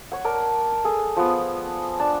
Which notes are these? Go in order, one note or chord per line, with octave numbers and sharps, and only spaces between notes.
C#5 F#5
A#4 D5 A5
G#4 A4
F3 B3
D4 A5